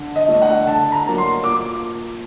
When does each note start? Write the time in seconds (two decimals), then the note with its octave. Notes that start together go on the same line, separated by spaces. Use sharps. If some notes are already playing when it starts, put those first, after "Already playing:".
Already playing: D3
0.16 D#5
0.28 A3 D4
0.42 F#5
0.67 D3 A5
0.92 A#5
1.05 F#3 A#3 D4
1.18 C6
1.44 A#2 D6